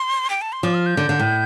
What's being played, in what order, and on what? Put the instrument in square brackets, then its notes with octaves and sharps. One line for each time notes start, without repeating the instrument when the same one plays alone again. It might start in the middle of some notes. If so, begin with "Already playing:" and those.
Already playing: [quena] C6
G5
A5
C6
[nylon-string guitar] F3 [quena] D6
[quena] F6
G6
[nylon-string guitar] D3
D3
A2